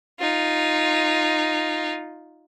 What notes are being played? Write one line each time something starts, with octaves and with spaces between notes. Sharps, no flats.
D#4 F4